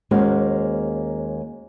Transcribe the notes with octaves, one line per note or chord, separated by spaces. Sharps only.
D#2 G#3 A#3 C#4 F#4 C5